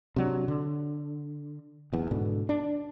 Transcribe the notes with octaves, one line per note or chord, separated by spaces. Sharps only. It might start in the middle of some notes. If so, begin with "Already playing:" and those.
C3 F#3 D4
D3
D1 E2 B3
G#2 B2 D3
D4